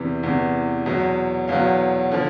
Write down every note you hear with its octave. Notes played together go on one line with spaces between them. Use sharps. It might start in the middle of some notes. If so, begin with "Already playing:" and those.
Already playing: E2 C3 E3
E2 C3 E3
E2 B2 F#3
E2 B2 F#3 F5
D3 F3